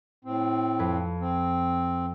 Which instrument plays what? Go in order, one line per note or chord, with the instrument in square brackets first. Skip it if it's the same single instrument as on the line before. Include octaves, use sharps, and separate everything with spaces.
[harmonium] A2 C4
[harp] F2 B4
[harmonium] C4